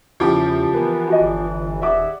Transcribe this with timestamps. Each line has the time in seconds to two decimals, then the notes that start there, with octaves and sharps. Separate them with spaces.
0.20 E2 C#3 F3 E4 G4 D6
0.73 E3 A#3 B3
1.08 F#4 D#5
1.21 G1 D5
1.81 D#1 G4 G#4 D5 E5 F#5 D6